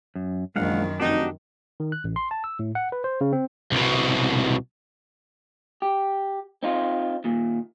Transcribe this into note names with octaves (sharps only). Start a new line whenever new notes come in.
F#2
A#1 F#2 D#3 G#3 F5 F#5
F1 D4 D#4 F#4 G4
D#3
F#6
A1
C6
A5
E6
A2
F#5
B4
C5
C#3
C4
C2 B2
G4
C4 D#4 F4
D#2 A#2